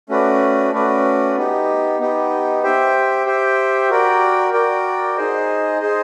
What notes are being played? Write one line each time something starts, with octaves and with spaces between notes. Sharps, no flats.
A3 C#4 F#4 B4 D5
A3 C#4 F#4 B4 D5
B3 D#4 G4
B3 D#4 G4
G4 C5 E5 G5
G4 C5 E5 G5
F#4 A#4 D5 G5
F#4 A#4 D5 G5
D#4 G#4 C5 D#5
D#4 G#4 C5 D#5